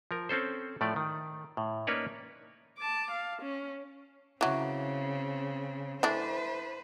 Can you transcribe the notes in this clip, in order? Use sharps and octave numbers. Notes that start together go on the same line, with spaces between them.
F3 A#4
C4 C#4 A4 C5
A2 F3 A3 D5
D#3
A2
A#3 C#4 D#4 B4 C#5 D5
A5 D6
F5
C#4
C#3 E3 F#3 C4
E3 A3 D4 B4 C5